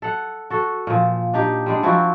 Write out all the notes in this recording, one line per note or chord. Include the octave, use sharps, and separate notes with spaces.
A4 F#5
F#4 A4
A#2 F3
D4 D#4 G4
G3 G#3 D4
F3 C4 E4 F#4